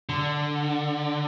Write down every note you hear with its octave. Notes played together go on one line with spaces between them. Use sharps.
D3